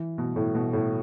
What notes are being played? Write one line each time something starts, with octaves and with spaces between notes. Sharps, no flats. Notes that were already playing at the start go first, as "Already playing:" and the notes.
Already playing: E3
B2
A2
B2
A2